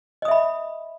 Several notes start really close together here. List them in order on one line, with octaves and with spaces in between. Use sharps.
D#5 D#6 E5 B5